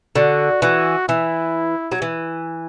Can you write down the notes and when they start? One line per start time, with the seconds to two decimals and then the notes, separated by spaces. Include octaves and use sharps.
0.15 D3 F#4
0.62 E3 F#4
1.08 E3 E4
1.92 F#3
2.02 E3